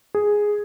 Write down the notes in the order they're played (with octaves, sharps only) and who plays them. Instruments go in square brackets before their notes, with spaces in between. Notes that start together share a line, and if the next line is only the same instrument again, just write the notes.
[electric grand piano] G#4